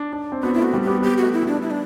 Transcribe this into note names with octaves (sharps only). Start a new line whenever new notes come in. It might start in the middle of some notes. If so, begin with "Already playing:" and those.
Already playing: D4
D4
C4
B3 F#4
E4
A3 F#4
G3
B3 G4
B3 G4
A3 F#4
E4
G3 D4
E4
D4